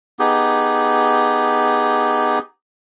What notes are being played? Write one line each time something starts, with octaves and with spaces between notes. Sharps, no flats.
B3 D#4 G4 G#4